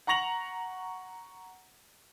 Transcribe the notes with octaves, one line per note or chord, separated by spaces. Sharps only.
F#5 A#5 C#6 A#6 F7 F#7